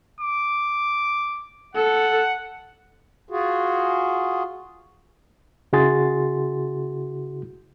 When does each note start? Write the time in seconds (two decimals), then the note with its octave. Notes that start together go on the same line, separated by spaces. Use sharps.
0.20 D6
1.75 A4 F#5
3.29 F4 F#4 G#4
5.73 C#3 E4 F#4 G#4 C6 A6